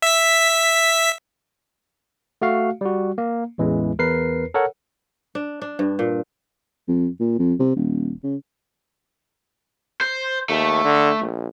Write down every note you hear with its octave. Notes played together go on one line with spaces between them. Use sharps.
E5 B6
A3 F#4 F5
G3 F#4
A#3
A1 E2 E3 G#3
E2 A#4 B4 C7
A4 A#4 C#5 F#5
D4
D4
G2
A#2
F2
A#2
F2
C3
D#1
C#3
C5
D#2 A3
D3
A#1